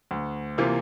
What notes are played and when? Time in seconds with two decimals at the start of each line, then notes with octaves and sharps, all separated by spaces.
0.11 D2
0.58 C3 E3 A#3 F4